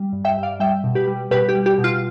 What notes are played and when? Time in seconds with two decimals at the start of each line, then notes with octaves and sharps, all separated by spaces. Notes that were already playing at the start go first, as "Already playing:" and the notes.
Already playing: G3
0.13 G2
0.25 E5 G5
0.37 G2
0.43 D5 F5
0.60 G3 E5 G5
0.84 B2
0.95 G4 B4
1.07 G3
1.31 B2 G4 B4
1.49 G4
1.55 G3
1.66 G4
1.78 B2
1.84 F4